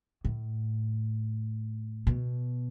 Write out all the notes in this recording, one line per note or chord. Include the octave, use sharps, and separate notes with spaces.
A2
B2